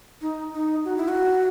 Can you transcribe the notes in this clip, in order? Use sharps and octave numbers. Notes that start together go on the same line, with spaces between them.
D#4
D#4
F#4
E4
F#4